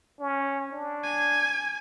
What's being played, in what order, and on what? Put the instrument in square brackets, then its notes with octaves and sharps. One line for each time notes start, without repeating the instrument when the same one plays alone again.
[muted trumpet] C#4
D4
[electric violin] G#5 G#6